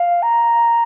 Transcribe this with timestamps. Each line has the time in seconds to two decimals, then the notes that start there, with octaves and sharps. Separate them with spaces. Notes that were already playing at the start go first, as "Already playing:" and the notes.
Already playing: F5
0.23 A#5